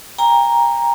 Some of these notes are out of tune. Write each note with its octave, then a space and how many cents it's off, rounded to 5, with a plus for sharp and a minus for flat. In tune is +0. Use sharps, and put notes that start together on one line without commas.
G5 +40 A#5 +0